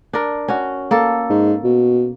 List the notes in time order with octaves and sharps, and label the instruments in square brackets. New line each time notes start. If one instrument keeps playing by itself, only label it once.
[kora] D4 A#4
C#4 F#4
A#3 A4
[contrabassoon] G#2
B2